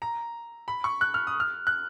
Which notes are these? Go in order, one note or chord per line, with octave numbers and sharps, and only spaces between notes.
A#5
B5
C#6
F#6
F6
D#6
F6
F#6